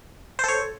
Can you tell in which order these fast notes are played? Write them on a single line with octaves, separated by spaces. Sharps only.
C5 A4 C#5